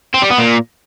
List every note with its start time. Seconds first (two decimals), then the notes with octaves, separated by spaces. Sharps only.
0.14 C4
0.22 G3
0.30 B3
0.38 A#2